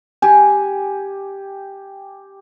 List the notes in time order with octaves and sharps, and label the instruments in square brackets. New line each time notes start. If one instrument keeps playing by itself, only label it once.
[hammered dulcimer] G4 G#5